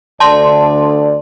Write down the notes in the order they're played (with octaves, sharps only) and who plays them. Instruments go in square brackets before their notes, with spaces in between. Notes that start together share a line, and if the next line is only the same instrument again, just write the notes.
[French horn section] D2 D3 D5 [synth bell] A5 C6